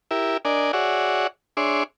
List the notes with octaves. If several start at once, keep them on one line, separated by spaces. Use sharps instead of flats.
E4 G4 A#4 E5
D4 A#4 D5 D#5 G#5
F#4 G#4 C#5 D5 E5 F#5
D4 G#4 C#5 E5 C6 D6